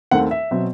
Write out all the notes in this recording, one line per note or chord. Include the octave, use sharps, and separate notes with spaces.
D#2 D#3 A3 C4 F#5
E5
B2 F#3 C4